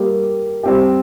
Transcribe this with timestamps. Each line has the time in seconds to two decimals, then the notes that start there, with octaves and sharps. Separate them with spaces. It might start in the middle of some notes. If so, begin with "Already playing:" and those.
Already playing: G3 A#3 G4
0.63 G3 C4 G4